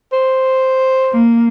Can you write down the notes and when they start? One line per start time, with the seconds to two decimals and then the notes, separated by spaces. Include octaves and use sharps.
0.13 C5
1.13 A#3